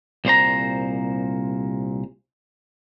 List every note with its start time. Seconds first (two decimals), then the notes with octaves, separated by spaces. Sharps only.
0.25 C2 A#2 C5 A#5